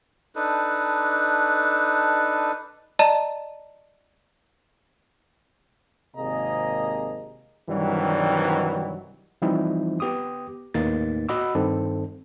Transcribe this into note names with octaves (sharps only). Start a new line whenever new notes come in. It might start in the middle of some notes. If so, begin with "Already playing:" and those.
D4 D#4 A4 B4
D5 D#5 A5 A#5
G#1 C3 A#3 G#4 D#5 A#5
G2 C3 D#3 E3 F#3 G3
E3 F3 G3 C4 D#4 E4
B3 G4 D6 D#6
D#2 A2 A#3 B3 D#4 A6
F#4 D#5 F#5 B5 D6 E6
G2 D#3 C4 D#4 A4